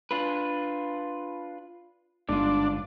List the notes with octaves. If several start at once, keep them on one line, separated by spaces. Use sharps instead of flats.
D4 F4 B4
G1 G#2 D4 F4